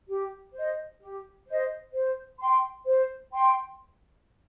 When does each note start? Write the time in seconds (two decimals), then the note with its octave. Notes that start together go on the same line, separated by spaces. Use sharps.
0.08 G4
0.54 C5 D#5
1.01 G4
1.47 C5 D#5
1.94 C5
2.40 G5 C6
2.86 C5
3.33 G5 C6